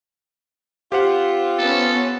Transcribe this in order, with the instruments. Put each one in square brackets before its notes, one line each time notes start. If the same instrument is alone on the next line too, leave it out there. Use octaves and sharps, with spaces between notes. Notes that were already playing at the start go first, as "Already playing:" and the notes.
[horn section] C4 F4 [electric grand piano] G4 C5 F#5
[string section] B3 C#4 [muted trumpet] A4